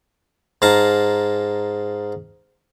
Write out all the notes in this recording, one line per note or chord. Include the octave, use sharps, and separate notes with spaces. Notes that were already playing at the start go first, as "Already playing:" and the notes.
G#2 F5 A5 A#5